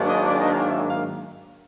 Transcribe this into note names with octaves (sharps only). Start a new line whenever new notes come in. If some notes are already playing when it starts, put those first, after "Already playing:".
Already playing: G#2 D#3 F#3 A#3 D4
D#5
D5
D#5
F5
E5
F5